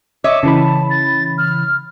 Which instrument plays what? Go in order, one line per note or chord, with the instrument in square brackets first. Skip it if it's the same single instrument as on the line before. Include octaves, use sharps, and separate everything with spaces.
[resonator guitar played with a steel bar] C#5 D#5 E5 [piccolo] D6
[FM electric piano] C#3 E3 B5 [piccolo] A5
[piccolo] A6
F6